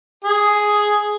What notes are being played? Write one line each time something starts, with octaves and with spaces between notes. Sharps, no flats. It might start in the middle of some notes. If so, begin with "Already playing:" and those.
G#4